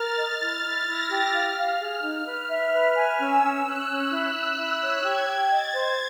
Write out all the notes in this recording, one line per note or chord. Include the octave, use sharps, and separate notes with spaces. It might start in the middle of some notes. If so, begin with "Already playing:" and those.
Already playing: A#4 F6 A6
D#5
E4 A6
E4
E4 A#6
G4
F5 F6
F5
G#4
D#4
B4
E5
B4
G#5
C#4 E6
C#4
C#4 F#6
C#4
E4
E4
E4
C#5
G4 G#6
G5
D#5 A6
C5